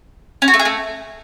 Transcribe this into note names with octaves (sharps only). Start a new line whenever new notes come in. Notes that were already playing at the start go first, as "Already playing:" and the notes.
C#4
F#4
A3
G#4
A3